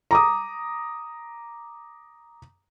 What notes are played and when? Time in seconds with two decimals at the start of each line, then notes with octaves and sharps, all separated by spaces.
0.11 A#5 D6 D#6